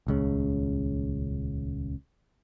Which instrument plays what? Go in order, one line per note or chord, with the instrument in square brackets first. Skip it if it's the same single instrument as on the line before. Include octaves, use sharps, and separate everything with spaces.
[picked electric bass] D#1 C#2 C#3